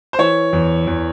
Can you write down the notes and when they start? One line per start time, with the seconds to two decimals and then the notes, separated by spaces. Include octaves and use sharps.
0.13 C5
0.19 E3 C#5
0.53 E2
0.87 E2